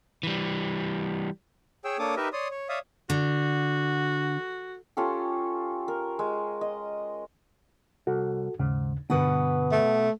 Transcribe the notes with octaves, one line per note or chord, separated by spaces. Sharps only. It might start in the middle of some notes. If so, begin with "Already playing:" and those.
E3 G3
G#4 C#5 G5 E6
A#3 D4 A4 C#5 D6 D#6
D#4 G4 A#4 B4 D#5 E5
C#5 D5 C6 D#6
C#5
C#5 D5 E5 F5 D#6
D3 F#4
C#4 F4 G4 A4
A#4
G#3
D#5
C2 F#4 A4
D#2 G#2 C#3
G2 B2 D3 B4 F#5
A3